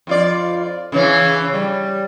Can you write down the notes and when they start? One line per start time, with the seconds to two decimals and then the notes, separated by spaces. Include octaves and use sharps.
0.07 F2 F4 D5
0.92 C#3 E3 C#4
1.54 G3